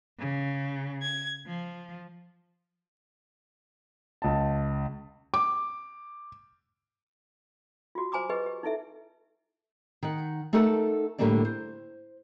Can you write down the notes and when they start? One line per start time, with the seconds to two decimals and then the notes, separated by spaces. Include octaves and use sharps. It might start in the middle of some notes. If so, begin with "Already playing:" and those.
0.18 C#3
1.04 G#6
1.45 F3
4.22 C#2 A5
5.34 D6
7.95 F4 F#4
8.12 C5 G#5 A#5 D6 D#6
8.29 G4 G#4 B4 D#5
8.46 G4
8.63 D#4 E4 A4 E5
10.03 D#3 F#5
10.53 A3 D#4 A4 A#4 F#5 A5
11.18 A2 D3 G3 A#3 D4 D5
11.45 C5